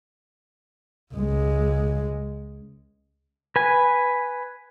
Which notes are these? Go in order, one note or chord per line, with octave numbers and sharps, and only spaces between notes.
C#2 G#3
B4 G#5